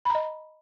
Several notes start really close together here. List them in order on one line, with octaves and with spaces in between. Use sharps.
B5 A#5 D#5